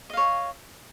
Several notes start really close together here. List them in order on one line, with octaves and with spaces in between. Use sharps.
D#5 F5 C#5